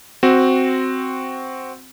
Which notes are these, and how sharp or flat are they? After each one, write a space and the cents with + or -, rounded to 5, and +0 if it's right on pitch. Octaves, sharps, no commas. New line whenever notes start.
C4 +0 F#4 +0